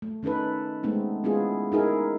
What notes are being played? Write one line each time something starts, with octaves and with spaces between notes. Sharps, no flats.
A3
D#3 C#4 D#4 A4 B4
G#3 A3 B3 C4 D#4
G#3 B3 C#4 E4 F4 G#4
D#4 E4 G#4 A#4